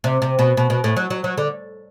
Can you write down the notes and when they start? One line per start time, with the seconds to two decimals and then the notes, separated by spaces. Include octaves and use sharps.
0.04 C3
0.22 C3
0.39 B2
0.57 B2
0.70 B2
0.84 A2
0.96 F#3
1.10 F#3
1.24 F#3
1.38 D3